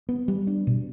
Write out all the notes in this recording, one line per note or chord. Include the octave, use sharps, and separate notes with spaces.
B3
G3
D4
B2